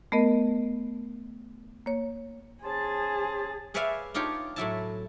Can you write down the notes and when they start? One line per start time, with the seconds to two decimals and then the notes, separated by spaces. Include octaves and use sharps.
0.12 A3 B3 A#4 D#5
1.86 A#3 C#5
2.64 C#4 G#4 C5 A5
3.74 G#4 B4 C#5 D5 E5 F5
4.14 D4 D#4 F4 G4 C#5
4.56 A2 F#3 E4 A5